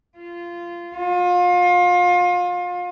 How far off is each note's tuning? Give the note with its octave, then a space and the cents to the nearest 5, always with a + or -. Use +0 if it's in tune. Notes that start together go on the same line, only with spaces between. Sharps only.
F4 -15
F4 +30